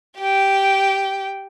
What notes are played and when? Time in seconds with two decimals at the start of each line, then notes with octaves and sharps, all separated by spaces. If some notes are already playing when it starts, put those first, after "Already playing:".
0.18 G4 G5